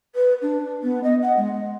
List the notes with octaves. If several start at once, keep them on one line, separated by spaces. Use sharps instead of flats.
B4
D4
B3
D#5
F#5
G#3